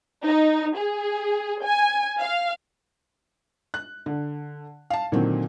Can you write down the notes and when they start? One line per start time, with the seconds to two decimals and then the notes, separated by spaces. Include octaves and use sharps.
0.24 D#4
0.76 G#4
1.63 G#5
2.21 F5
3.74 F#6
4.06 D3
4.90 F5 A5
5.12 A#2 D3 D#3 F#3 C4